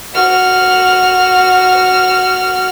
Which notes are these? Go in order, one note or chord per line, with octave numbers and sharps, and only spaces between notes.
F#4 F6